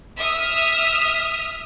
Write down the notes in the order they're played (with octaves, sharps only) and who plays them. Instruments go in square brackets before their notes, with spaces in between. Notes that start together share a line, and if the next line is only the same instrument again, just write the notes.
[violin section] E5 D#6 F6